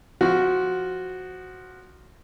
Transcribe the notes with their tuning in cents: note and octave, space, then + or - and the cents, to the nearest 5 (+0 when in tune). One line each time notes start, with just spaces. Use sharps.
F3 +0 F#4 +0